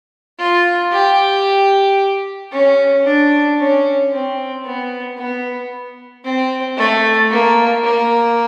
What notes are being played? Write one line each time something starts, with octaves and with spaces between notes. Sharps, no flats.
F4
G4
C#4
D4
C#4
C4
B3
B3
C4
A3
A#3
A#3